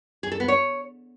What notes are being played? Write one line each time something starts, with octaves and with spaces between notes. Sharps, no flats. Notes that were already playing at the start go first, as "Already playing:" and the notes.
G#4
A4
B3
C#5